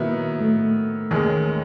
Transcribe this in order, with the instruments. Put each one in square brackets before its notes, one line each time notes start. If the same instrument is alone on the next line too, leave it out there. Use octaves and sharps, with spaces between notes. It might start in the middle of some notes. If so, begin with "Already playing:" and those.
Already playing: [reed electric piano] A#2 A#3 [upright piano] D#3 F#3 B3 E4
[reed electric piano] A2 A3
[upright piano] D#2 D#3 G#3 C#4